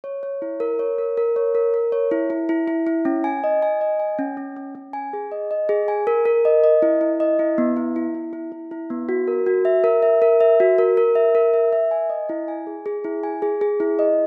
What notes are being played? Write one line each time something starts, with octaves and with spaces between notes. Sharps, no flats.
C#5
C#5
E4
A#4
C#5
A#4
A#4
C#5
A#4
A#4
C#5
E4
E4
E4
E4
E4
C#4
G#5
D#5
G#5
D#5
G#5
C#4
C#4
C#4
C#4
G#5
G#4
D#5
D#5
G#4
G#5
A#4
A#4
D#5
D#5
E4
E4
D#5
E4
B3
E4
E4
E4
E4
E4
E4
B3
F#4
A#4
F#4
E5
A#4
E5
A#4
E5
F#4
A#4
A#4
E5
A#4
E5
E5
G#5
D#5
E4
G#5
G#4
G#4
E4
G#5
G#4
G#4
E4
D#5